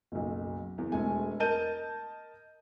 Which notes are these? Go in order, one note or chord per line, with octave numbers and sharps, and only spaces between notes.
F#1 B1
E2
E1 G#3 A3 G#5
A#4 D#5 A5 G6 D#7